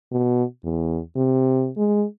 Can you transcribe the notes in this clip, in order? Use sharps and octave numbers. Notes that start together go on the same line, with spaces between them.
B2
E2
C3
G#3